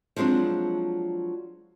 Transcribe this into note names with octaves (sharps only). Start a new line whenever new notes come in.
F3 F#3 G#3 C4 D4